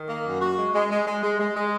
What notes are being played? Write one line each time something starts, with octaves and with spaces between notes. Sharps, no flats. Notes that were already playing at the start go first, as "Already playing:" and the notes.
Already playing: D#3
A#3
F#2
F#4
G#3
G#3
G#3
G#3
G#3
G#3
G#3